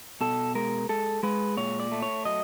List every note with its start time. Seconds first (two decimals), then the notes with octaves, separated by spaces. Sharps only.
0.21 B2 A4
0.55 G#3 A#4
0.89 G#3 A4
1.23 G#3 B4
1.57 A#2 C#5
1.80 D5
1.92 A3
2.02 C#5
2.25 F#3 D#5